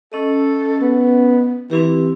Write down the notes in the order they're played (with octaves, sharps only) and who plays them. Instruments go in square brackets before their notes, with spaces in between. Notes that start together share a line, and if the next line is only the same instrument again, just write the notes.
[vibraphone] C#4 D#5 [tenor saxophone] A4
[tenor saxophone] B3
[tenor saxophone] E3 [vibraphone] C4 E4 G4